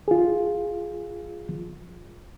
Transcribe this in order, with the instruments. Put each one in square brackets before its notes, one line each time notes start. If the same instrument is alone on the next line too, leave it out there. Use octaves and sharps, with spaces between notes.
[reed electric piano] F4 G#4